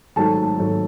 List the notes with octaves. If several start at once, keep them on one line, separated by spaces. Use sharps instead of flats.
G#1 G#2 F#3 A3 A4 A5
G#1 G#2 F#3 A3